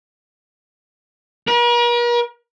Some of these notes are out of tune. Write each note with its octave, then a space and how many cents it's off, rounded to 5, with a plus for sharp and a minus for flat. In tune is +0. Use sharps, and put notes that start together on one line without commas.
A#4 +45